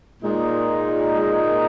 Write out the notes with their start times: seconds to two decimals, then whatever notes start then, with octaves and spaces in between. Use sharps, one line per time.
0.23 A#2 G#3 D#4